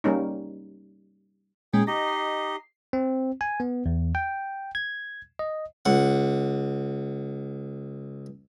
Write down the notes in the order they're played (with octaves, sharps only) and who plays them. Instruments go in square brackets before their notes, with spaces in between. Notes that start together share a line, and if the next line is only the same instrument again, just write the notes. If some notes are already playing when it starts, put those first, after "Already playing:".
[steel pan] G3 A#3 C#4 D#4
[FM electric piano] A#2 G#3 C#4 [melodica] G#4 G5
[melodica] D#4 G4 D#5 [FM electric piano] A#6
[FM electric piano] C7
[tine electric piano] C4
G#5
B3
E2
G5
G#6
D#5
[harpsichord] C#2 F#5